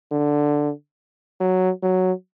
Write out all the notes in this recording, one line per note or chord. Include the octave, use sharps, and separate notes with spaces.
D3
F#3
F#3